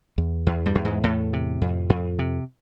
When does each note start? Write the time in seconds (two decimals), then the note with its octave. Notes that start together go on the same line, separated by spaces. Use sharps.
0.18 E2
0.47 E2
0.66 G2 G3
0.75 E2
0.85 G#2 G#3
1.04 E2 A2 A3
1.33 C3
1.61 F2
1.90 F2
2.19 C3